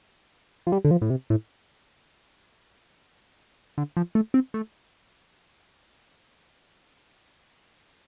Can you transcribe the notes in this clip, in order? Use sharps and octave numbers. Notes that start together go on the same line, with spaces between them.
F3
G3
D3
F3
A2
C3
A2
D3
F3
A3
C4
A3